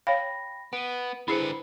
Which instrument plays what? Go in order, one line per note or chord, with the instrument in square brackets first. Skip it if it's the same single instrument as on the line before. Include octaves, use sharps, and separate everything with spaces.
[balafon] C#5 F5 [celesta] G5 B5 A#6
[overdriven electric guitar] B3 [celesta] D7 D#7
[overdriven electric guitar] D3 B4 [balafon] E4 G#4 C5 [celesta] B5 C7 C#7